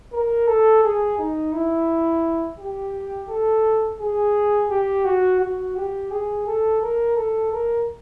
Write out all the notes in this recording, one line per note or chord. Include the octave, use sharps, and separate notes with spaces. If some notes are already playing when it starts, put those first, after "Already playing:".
A#4
A4
G#4
D#4
E4
G4
A4
G#4
G4
F#4
F#4
G4
G#4
A4
A#4
A4
A#4